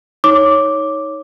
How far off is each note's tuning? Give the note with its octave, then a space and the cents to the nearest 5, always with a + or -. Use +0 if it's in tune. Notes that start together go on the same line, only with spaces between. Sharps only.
D#4 +25 C#5 +0 D6 +0